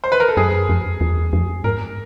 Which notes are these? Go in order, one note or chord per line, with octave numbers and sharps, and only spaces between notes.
C5
B4
A#4
A4
F#2 G#4
F2
E2
F2
G#2 A#4